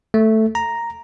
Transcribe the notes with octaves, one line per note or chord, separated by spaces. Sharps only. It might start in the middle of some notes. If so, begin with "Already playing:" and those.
A3
A#5